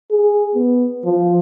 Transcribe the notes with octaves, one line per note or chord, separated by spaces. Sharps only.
G#4
B3
F3